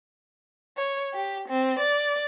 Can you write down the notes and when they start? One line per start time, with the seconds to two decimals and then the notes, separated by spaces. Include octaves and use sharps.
0.77 C#5
1.14 G4
1.47 C4
1.79 D5